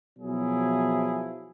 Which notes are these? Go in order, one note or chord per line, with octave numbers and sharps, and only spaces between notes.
B2 F3 F#3 E4 G#4